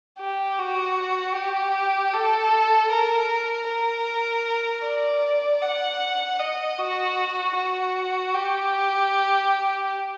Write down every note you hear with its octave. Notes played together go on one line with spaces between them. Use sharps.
G4
F#4
G4
A4
A#4
A#4
D5
F#5
D#5
F#4
F#4
G4